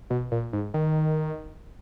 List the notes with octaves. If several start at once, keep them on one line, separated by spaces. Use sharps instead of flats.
B2
A#2
G#2
D#3